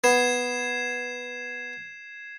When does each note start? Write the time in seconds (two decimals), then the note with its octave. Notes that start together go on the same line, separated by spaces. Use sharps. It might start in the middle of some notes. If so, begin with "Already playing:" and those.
0.04 B3 G#6 C7 E7